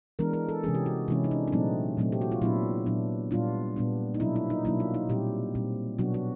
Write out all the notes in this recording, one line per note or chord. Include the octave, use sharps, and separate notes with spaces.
E3 G#3 B3 D4 A#4
A#4
A4
C3 E3 G#3 C#4 G#4
G4
F#4
C3 E3 G#3 C#4 E4
D#4
D4
D4
A#2 F#3 A3 C4 D#4
A#2 F#3 A3 C4
G4
F#4
F4
A#2 F#3 B3 D4 E4
A#2 F#3 B3 D4
A#2 G3 B3 D4 F4
A#2 G3 B3 D4
D#4
B2 F#3 A#3 D4 E4
E4
D#4
B2 F#3 A#3 D4 E4
F4
D#4
A#2 G3 C4 G4
A#2 G3 C4
B2 F#3 B3 D4 F#4
F#4